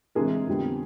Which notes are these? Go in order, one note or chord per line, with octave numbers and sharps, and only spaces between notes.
D2 C3 E3 G#3 G#4 A#4
F2 D3 G3 B3